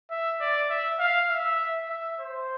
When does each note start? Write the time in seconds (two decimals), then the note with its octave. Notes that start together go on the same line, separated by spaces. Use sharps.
0.10 E5
0.40 D5
0.70 E5
0.99 F5
1.29 E5
1.89 E5
2.20 C5